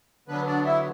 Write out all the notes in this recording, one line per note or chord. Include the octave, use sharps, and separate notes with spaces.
D3 F#3 B3 D4 B4
D4 D5
E4 E5